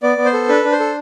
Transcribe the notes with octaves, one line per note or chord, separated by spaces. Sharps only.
B3 D5
B3
C5
A4
D4 B4
D4
C5
A4